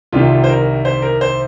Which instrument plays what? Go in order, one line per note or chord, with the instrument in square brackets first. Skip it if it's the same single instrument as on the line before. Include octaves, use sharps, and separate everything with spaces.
[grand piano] C2 C3 D#3 F4
C5
A#4
C5
A#4
C5